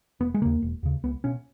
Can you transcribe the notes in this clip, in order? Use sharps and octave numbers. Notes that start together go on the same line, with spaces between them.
E1 B3
G#3
D#2 C#3 A#3
E1
D#2 C#3
C#2 B3
B2 C#4